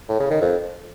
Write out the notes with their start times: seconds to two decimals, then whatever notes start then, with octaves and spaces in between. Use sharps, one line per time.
0.09 A2
0.20 C#3
0.31 D#3
0.41 F2